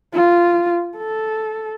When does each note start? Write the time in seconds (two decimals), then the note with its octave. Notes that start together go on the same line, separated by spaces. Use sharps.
0.14 F4
0.97 A4